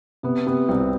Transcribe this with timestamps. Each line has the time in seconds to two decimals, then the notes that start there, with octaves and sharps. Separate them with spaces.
0.23 C3 B3
0.46 C3 B3
0.69 C2 C4